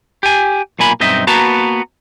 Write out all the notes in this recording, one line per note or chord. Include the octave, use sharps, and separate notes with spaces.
G4 G#5
B1 A#2 A#3 G#5 B5
B1 G2 C4 D#4 D#5 E5
A#3 B3 F#4 B4 A5 A#5